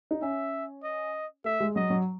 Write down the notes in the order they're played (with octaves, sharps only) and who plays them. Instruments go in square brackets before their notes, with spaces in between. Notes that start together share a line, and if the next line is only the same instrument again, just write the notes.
[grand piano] D#4
[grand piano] C#4 [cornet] E5
[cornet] D#5
[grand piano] A3 [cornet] E5
[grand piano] G#3
[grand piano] F#3 [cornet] D#5
[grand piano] F#3